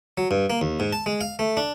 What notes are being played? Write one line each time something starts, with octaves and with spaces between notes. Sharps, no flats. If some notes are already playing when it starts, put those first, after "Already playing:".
F#3
G2
A#3
D#2
G#2
A5
G#3
F5
A3
D4